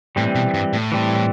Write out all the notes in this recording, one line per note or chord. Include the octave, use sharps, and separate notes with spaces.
A2 E3 G3 C4
B2
G2
A2
E3 G3 C4